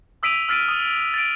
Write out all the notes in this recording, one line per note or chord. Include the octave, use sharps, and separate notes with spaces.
D#6 E6 B6 D7 D#7 F7
E6 F6 A6 B6 D7 D#7
D#6 D#7
A6 D7